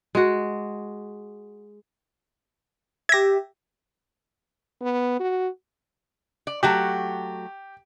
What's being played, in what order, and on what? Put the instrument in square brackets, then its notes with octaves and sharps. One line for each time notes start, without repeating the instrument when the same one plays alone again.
[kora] G#3 F#4
[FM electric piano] G4 E5 [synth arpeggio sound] G#6 A#6
[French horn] B3
F#4
[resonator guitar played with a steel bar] D5
[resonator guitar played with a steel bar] F#3 A3 F#4 [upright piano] G4